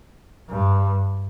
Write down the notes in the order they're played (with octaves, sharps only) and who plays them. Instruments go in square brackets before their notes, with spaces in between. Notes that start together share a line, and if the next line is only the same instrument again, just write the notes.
[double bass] G2